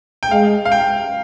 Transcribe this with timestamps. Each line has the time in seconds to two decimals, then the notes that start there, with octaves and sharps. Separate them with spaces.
0.23 G5
0.30 G#3 F5
0.65 F5
0.72 G5